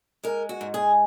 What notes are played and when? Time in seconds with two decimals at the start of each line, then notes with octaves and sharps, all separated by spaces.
0.24 G#3 A#4
0.49 F#4
0.61 G#2
0.74 G#4